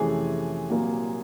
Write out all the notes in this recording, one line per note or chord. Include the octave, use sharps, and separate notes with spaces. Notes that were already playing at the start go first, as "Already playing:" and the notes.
Already playing: F2 C3 E3 A3 C#4 G#4 G#5
C2 A#2 F#3 A#3